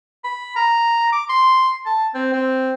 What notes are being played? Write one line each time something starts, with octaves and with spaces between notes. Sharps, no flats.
B5
A#5
D6
C6
A5
C4
C4